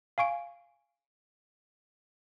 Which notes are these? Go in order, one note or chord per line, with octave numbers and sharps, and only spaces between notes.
F5 G#5 C#6 D7